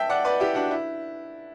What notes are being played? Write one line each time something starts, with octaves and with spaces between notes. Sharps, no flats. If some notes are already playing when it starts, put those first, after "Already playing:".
Already playing: E5 G5 A5
D5 F#5
B4 D5
E4 G4
D4 F#4
E4